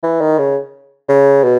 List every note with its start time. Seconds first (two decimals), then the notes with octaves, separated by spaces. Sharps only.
0.03 E3
0.21 D#3
0.38 C#3
1.09 C#3
1.44 B2